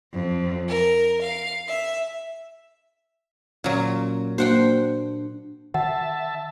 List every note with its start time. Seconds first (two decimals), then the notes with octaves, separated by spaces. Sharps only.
0.13 F2
0.70 A#4
1.23 F5
1.68 E5
3.64 A#2 F#3 C#4
4.38 A#3 D4 F#4 C5 F#5 G5
4.59 D4
5.74 D#3 E5 F#5 A5